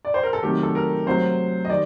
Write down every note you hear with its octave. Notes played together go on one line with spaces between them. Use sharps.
D5
C5
A#4
A4
C3 D#3 F#3 A3 G4
A4
A#4
C3 F#3 A3 C5
D#5
D#3 G3 D5